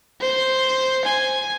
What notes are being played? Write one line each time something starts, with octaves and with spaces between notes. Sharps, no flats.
C5
G#5